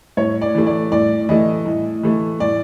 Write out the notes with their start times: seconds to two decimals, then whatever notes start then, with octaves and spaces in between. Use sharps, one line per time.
0.17 A2 C#5
0.42 D5
0.55 E3 A3
0.67 D5
0.92 A2 D5
1.29 E3 A3 D#5
1.66 A2
2.03 E3 A3
2.40 A2 D5